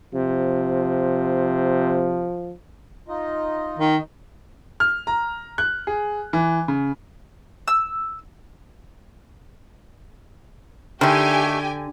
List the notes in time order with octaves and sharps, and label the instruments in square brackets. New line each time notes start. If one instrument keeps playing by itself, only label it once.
[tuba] C3 [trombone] F3
[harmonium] D#4 F4 D#5
[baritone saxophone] D#3
[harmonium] D#4
[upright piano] F6
A#5
F#6
G#4
E3
C#3
[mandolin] E6
[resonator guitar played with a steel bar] D3 [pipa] D#3 A3 [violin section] G4 G5 G#5